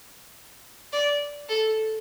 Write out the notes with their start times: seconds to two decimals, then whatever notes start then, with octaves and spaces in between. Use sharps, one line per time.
0.93 D5
1.49 A4